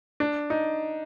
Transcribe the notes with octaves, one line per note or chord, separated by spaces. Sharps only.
D4
D#4